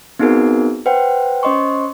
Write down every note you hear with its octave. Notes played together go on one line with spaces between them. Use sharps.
B3 C4 D#4 F#4 G#4 A#4
B4 C5 F#5 G5
C#4 C5 D#5 C6 C#6